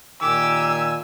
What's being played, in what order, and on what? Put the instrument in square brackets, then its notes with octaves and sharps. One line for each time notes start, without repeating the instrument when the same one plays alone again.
[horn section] A#2 D#3 G#5 [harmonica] G4 D6 [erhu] E6